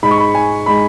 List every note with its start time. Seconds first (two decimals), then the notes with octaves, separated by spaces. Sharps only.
0.03 G#2 G#3 D#4 B5
0.11 C#6
0.18 B5
0.35 G#5
0.66 G#3 D#4 B5